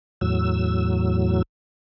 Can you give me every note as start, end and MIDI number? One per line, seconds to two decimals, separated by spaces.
0.21 1.42 40
0.21 1.42 45
0.21 1.42 54
0.21 1.42 88